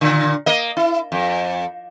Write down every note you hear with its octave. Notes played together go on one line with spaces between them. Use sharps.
A#2 D3
A#3 D#5
E4
F2